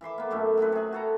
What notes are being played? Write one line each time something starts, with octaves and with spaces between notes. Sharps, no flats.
E3 E5 C6 D6
A#3 B3
F#2 A#2 A3 G4
F#3 C4 E4 B4
C3 G#4
F#4 A4 A#5